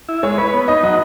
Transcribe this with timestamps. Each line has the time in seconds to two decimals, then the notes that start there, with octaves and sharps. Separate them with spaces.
0.09 E4
0.23 G#3 C#5
0.38 B4 C#5
0.54 B3
0.68 D#4 D#5
0.83 F#3 D#5